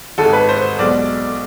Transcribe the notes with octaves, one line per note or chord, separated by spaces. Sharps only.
G#1 G#2 G#3 A4
B4
C5
B1 B2 G#3 D5